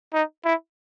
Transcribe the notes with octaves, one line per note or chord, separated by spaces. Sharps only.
D#4
E4